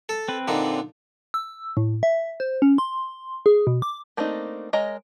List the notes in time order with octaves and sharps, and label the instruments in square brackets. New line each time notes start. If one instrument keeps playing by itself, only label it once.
[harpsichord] A4
[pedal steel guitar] C4 B4
[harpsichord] A#2 D3 D#4
[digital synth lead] E6
A2
E5
C5
C#4
C6
G#4
B2
D6
[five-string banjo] A3 A#3 C4 D4 D#4
G#3 A#4 C#5 D#5 A#5